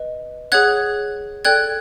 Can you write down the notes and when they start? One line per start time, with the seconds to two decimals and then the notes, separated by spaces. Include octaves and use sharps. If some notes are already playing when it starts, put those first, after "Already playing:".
Already playing: B4 D#5
0.52 G#4 C#5 F#5 F#6 G#6
1.45 A4 D5 G5 F#6 G#6